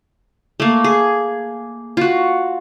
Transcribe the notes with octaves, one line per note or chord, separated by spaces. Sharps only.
A3 A#3
G#4
F4 F#4